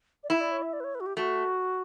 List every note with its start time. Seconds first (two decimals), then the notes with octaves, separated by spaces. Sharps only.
0.24 D5
0.30 E4 E5
0.41 D5
0.52 C#5
0.62 E5
0.73 D5
0.80 B4
0.84 C#5
0.95 B4
1.00 F#4
1.06 G4
1.17 A3 F#4